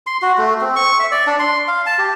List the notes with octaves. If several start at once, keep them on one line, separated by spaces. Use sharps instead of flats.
C6
F#4
A3
C4
C#6
E5
D5
D4
C6
F5
A5
G4